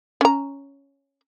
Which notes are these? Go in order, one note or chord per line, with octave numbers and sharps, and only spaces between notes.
C#4 A#5